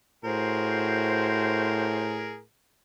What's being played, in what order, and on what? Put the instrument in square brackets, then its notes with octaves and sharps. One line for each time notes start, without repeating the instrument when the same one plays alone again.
[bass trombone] A2 [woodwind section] F#4 C5 [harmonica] G#4 A#4